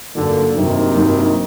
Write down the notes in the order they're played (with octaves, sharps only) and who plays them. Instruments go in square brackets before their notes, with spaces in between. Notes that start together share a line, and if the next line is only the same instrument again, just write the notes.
[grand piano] G2 F#3 A#3 D#4 [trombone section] A#2 D3
[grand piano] G2 F#3 A#3 D#4 [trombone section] C3 D#3
[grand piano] G2 F#3 A#3 D#4